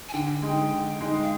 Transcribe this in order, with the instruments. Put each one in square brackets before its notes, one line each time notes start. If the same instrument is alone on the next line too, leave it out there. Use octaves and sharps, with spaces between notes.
[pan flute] G#5
[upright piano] D3 [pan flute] G5
[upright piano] G#3 D#4
D3
G#3 D#4
[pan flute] F5